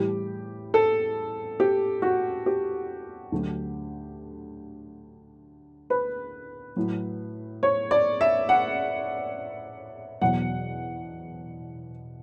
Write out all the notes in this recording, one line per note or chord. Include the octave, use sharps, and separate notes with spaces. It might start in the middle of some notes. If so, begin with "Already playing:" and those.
Already playing: A2 E3 G3 G4
A4
G4
F#4
G4
D2 D3 F#3
B4
A2 F#3
C#5
D5
E5
F#5
E2 B2 F#3 F#5